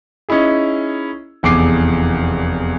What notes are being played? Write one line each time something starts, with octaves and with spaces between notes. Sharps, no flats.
C#4 D#4 E4 G#4
F1 E2 G#4 D6 C7